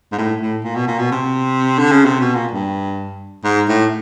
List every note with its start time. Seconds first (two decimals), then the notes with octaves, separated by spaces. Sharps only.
0.12 G#2
0.18 A2
0.42 A2
0.64 A#2
0.76 B2
0.88 A#2
0.99 B2
1.12 C3
1.79 D3
1.92 C#3
2.05 C3
2.21 B2
2.35 A#2
2.52 G2
3.44 G#2
3.69 A2